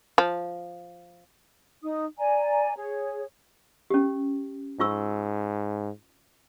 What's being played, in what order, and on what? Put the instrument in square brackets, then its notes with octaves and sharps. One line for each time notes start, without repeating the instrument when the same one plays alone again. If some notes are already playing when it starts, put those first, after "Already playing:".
[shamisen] F3
[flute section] D#4 D#6
D5 G#5 A#5
G#4 C#5
[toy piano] C#4 G4
[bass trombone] G#2 [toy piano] F4 C#6 E6